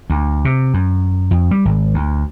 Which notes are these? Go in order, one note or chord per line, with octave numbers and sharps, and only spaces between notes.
D2
C3
F#2
F2
G3
G#1
D2